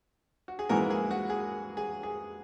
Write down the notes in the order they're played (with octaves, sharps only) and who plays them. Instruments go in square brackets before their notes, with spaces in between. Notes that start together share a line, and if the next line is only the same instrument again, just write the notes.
[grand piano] F#4
G#4
[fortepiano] G#2 E3 A#3 [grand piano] F#4 A#4
[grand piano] G#4
F#4
G#4
G#4
G#4